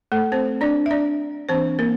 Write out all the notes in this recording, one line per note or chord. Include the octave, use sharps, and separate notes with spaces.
A3 A4
C4 C5
D4 D5
E5
D4 D5
E3 A#3 C4 D4 C5
A#3 A#4